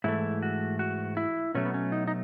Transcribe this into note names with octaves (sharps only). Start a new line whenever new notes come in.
G#2 E3 A3 E4
F#4
F#4
E4
B2 F#3 A3 C#4
B3
C#4
D#4
D#4